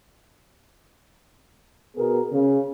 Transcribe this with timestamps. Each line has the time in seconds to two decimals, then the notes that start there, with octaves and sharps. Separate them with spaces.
1.96 B2 B3 G#4 A#4
2.33 C#3